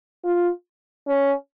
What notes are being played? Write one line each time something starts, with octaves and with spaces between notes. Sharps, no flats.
F4
C#4